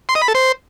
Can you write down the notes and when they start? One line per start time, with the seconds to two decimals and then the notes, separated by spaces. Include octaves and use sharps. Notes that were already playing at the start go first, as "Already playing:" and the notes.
0.09 C6
0.15 D#5
0.22 B5
0.28 A4
0.35 C5